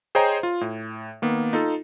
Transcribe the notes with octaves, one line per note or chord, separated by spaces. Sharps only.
G#4 C5 C#5 D#5 G5 A#5
F4
A2
D#3 A#3 B3
D#4 F4 A4